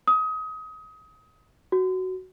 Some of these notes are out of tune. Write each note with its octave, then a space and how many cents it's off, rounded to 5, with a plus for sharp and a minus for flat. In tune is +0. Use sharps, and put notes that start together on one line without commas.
D#6 +25
F#4 +10